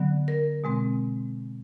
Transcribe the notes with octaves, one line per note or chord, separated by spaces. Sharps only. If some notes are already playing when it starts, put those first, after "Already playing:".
Already playing: D3 F#3 B3
A#4
B2 G#3 C4